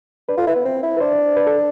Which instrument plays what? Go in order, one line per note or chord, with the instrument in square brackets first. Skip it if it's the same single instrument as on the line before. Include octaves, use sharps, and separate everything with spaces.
[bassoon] D4 [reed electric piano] B4
[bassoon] F4 [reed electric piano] A4
[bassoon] E4 [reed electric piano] B4
[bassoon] B3
C4
E4
[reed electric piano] B4
[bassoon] D4 [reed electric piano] C5
[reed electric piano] B4
A4